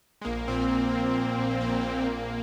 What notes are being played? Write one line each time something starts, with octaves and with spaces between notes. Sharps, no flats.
G#3
A#1 A#3
A#2 C4
A#1
A#2
A#1
A#2
A#1 A#3
A#2
A#1